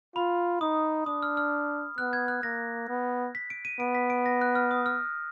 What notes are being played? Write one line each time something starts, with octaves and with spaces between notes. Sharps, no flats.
F4 B5
D#4 D#6
D4 D#6
F6
F6
B3 F#6
G#6
F#6
A#3 A#6
B3
B6
D7
D#7
B3 D7
B6
D7
A#6
F#6
F6
D#6
F6